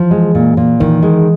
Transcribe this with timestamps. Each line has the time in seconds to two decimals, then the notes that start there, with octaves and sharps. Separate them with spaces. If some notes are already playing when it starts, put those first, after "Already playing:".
Already playing: E3 F3
0.11 G#3
0.35 A#2
0.57 A#2
0.80 D#3 E3
1.03 G#3